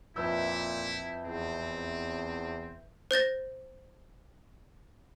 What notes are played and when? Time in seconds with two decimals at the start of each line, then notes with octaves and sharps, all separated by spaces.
0.16 F2 A#2 E4 B4 E5 E6 G6
1.25 E2 C4
3.11 C5 G6 A6 A#6